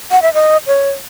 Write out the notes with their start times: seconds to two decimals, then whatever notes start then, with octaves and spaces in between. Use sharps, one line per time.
0.11 F#5
0.22 E5
0.34 D#5
0.67 C#5